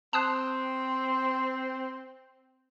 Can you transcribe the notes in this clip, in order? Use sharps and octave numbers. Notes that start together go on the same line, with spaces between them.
C4 A5 D#6 F#6